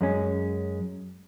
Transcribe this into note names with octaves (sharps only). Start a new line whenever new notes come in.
F#2 G#3 C#4